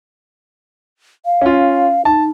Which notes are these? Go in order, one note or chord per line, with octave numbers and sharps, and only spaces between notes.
F5
C#4 F4
D#4 A5